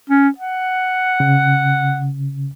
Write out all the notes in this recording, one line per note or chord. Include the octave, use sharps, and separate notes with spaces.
C#4
F#5
C#3